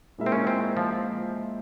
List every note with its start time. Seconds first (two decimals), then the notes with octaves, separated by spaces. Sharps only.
0.18 A#2 G#3 E4 A#4 E5
0.26 C4
0.32 C#4
0.47 C4
0.77 F3